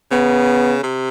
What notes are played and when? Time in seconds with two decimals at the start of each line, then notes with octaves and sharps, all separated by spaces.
0.11 C#3 B3
0.83 C3